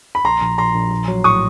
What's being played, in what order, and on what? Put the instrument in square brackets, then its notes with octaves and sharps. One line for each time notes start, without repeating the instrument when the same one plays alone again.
[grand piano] B5
[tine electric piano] A#1 [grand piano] A#5 C6
[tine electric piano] A#1
[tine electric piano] A#1 [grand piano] A#5 C6
[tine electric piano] A#1
A#1
F#3
[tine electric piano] A2 [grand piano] C#6 D#6